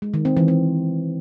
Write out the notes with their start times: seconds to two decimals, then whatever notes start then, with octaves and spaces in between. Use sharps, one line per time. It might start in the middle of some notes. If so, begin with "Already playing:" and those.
0.02 G#3
0.14 D#3
0.25 C4
0.37 E3
0.48 C4